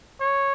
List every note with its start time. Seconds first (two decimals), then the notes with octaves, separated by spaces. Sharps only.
0.21 C#5